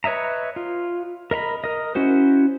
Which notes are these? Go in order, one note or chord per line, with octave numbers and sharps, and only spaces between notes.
B4 C#5 D#5 E5 A#5
F4
A#4 D#5 A#5 B5
A#4 D#5
C#4 E4 F#4 C5